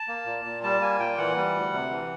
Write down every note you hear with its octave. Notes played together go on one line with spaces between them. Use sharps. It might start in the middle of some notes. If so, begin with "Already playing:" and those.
Already playing: A5
A#3
A#2
A#2
G3 A5
A#3 G#5
A#2 G5
E3 F#5
G3
D2
C3
E3